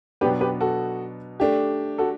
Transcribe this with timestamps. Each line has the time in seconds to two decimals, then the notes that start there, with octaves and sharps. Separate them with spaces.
0.21 B2 F#3 B3 D4 G4 B4
0.41 G4 B4
0.61 F#4 A4
1.40 A3 D4 G4
1.98 F#4 A4